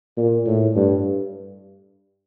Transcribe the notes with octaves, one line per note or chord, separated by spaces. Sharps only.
A#2
A2
G2